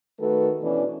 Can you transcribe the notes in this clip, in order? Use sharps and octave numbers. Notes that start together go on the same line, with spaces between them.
D#3 A3 F#4 A4 B4
B2 E3 C#4 D4